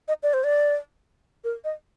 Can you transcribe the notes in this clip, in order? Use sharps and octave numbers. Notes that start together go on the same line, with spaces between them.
D#5
D5
C5
D5
A#4
D#5